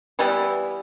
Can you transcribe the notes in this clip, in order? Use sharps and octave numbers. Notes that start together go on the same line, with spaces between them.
E3 G3 B3 E4